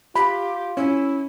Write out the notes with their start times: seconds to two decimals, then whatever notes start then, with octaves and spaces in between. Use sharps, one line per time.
0.16 F4 G4 B5
0.77 C#4 E4